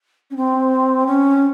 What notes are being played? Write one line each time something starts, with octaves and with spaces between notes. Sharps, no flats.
C#4
C4
C#4